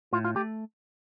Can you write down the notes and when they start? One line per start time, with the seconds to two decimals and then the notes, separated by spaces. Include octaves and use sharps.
0.13 A2 F4
0.25 F4
0.36 A3 G4